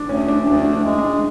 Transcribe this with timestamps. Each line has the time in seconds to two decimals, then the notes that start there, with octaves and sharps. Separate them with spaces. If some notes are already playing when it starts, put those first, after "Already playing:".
Already playing: D4
0.09 D2 C#4
0.28 D4
0.47 D2 D4
0.73 D4
0.85 G#3
0.98 D4